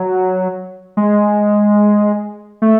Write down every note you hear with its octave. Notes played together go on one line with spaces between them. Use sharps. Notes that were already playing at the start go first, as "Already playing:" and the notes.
Already playing: F#3
G#3
A3